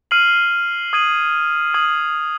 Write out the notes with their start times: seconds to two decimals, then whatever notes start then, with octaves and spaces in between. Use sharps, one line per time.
0.11 F6 C7 D#7 F#7
0.93 D#6 G#6 D#7 F#7
1.74 D#6 G#6 D#7 F#7